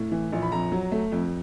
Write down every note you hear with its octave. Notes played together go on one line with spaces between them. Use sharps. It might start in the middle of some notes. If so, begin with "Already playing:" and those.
Already playing: A2
E3
A#1
B5
F2 A#5
F#3
A3
F2